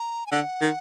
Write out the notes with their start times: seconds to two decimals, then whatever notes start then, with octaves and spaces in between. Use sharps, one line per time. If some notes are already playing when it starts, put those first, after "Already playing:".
Already playing: A#5
0.26 G#5
0.32 D3 F#5
0.61 D#3